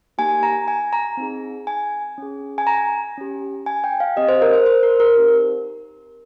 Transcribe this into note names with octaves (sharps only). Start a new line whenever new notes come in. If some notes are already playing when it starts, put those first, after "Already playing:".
A#3 D#4 G4 G#5
A#5
G#5
A#5
C4 D#4 G#4
G#5
C#4 G#4
G#5
A#5
C#4 G4
G#5
G5
F5
C4 G4 D#5
C5
A#4
C5
C5
A#4
A#4
C4 D#4 G4